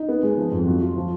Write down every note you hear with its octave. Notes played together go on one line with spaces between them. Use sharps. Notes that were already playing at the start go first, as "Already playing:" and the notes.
Already playing: D#4
B3
G#3
F3
F2
F#3
F4
F3